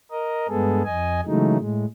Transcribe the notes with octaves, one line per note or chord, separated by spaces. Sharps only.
A#4 D#5
G2 G#3 B3 G#4 A4
F2 D#5 G#5
C#3 E3 F#3 G#3 A3 D#4
A2 G#3